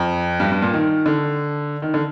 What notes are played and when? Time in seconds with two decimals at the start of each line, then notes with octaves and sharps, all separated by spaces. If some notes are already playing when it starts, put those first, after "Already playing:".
Already playing: F2
0.40 G2
0.52 G2
0.62 A#2
0.73 D#3
1.06 D3
1.82 D#3
1.94 D3